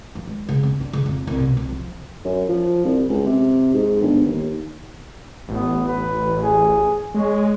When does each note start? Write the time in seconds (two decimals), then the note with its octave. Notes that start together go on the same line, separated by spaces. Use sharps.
0.15 F3
0.27 G#3
0.49 C#3
0.63 C#4
0.80 D4
0.93 C#3
1.06 F2
1.27 C2
1.40 B2
1.57 C2
1.69 F3
2.24 F#2
2.48 F3
2.85 C2
3.09 C#2
3.26 C3
3.74 G#2
4.02 G1
4.26 D#2
5.48 A1 B3
5.88 B4
6.42 G#4
7.14 G#3 C#5